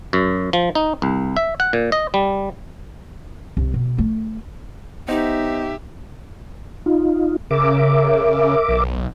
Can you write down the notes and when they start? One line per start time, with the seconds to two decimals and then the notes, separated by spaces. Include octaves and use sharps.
0.13 F#2
0.53 F3
0.75 D#4
1.02 C2
1.37 E5
1.60 F#5
1.73 A#2
1.92 D#5
2.14 G3
3.57 C2
3.74 B2
3.98 A3
5.08 B3 D#4 G4 C5 D#5 E5
6.86 D#4 F4
7.51 C#3 A#4 E5 D6
8.68 B1